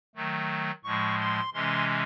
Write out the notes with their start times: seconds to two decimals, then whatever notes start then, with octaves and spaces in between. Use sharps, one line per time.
0.15 D#3 F#3 A3
0.84 A2 F3 G#3 C#6
1.20 C6
1.54 C3 E3 G#3 C#4 C6